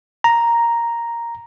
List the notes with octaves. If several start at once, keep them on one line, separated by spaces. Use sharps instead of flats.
A#5